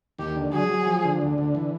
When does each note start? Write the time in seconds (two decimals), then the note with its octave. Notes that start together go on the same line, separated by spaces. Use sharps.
0.18 D#2 G4
0.36 D3
0.53 F#3 G#4
0.70 F#3
0.86 F3
1.04 D3
1.21 D2
1.38 D3
1.55 E3